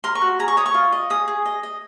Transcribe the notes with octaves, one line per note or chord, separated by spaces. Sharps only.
A#4 C6
C#6
F#4
G#4 A#5
C#6
C#5 D#6
C#6
F4
D#5
G#4 D#6
G#4
D#5
D#5